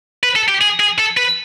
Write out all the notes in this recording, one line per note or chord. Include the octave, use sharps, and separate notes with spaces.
B4
A4
G4
G#4
G#4
A4
B4